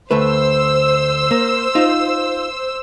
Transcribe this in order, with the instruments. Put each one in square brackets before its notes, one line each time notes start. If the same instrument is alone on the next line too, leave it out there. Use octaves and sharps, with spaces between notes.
[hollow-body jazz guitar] D2 A3 B4 [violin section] C5 E6
[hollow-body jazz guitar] A#3
D#4 F4